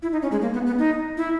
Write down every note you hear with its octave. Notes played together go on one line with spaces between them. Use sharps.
E4
D#4
C#4
G#3
A#3
B3
B3
D#4
E4